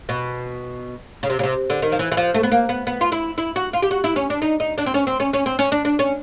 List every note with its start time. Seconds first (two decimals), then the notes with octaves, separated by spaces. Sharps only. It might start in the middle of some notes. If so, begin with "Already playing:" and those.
0.09 B2
1.23 C#3
1.30 C3
1.39 C#3
1.43 C3
1.70 D3
1.82 D#3
1.92 F3
1.99 E3
2.12 E3
2.17 F3
2.34 A3
2.43 B3
2.52 A#3
2.69 B3
2.87 B3
3.01 F4
3.12 E4
3.38 E4
3.56 F#4
3.73 F4
3.82 G4
3.91 F#4
4.04 E4
4.16 C#4
4.30 D4
4.42 D#4
4.60 D#4
4.78 D4
4.86 C4
4.94 C#4
5.07 C4
5.20 C#4
5.33 C#4
5.46 C4
5.59 C#4
5.72 D4
5.85 D4
5.99 C#4